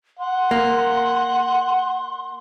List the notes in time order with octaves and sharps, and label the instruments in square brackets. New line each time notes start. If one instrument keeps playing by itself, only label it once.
[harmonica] F#5 [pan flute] C6
[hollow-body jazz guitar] A#3